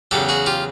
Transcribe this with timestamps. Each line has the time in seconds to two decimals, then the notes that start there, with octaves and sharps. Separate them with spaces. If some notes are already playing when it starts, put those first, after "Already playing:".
0.11 E2 C#3 F#3 G4 A4
0.29 F#4 G#4
0.46 F4 G4